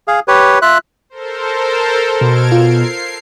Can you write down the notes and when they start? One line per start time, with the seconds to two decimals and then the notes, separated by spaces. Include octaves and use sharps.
0.08 G#4 F5
0.28 G4 B4 C#5
0.62 F4 E5 F#6
1.10 A4 A#4 C5
2.21 B2 F6 G#6 D7
2.52 F4 C7